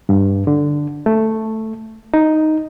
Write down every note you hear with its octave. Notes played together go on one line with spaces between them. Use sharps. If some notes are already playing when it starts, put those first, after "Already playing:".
G2
D3
A3
D#4